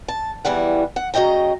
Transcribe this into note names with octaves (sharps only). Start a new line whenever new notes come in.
A5
E2 E3 G3 F#5
F#5
C#3 F#3 D#5 G5 A#5